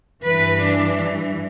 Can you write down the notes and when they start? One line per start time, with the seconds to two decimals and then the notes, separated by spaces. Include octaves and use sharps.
0.24 G2 E3 B4
0.60 D4